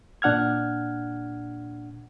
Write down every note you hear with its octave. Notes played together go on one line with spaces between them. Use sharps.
A#2 D4 F#5 F6 G#6